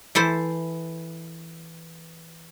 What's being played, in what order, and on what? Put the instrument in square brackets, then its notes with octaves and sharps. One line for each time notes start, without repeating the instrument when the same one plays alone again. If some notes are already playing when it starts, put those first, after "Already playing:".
[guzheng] E3 E4 A4 C5